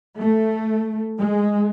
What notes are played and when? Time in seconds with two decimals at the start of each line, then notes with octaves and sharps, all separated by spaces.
0.19 A3
1.18 G#3